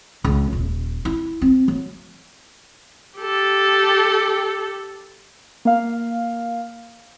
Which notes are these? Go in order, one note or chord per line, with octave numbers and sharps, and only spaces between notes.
C#2
D#1
E4
C4
F#3
G4 A4
A#3 F5